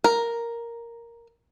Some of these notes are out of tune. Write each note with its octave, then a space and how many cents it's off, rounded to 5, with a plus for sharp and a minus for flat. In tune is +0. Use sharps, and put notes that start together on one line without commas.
A#4 +0